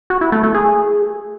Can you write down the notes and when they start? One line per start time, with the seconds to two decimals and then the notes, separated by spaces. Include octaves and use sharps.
0.10 F#4
0.21 E4
0.32 A3
0.43 A3
0.55 G#4